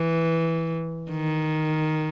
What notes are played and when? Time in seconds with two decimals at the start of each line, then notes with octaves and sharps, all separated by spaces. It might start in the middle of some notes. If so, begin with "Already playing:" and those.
Already playing: E3
1.11 D#3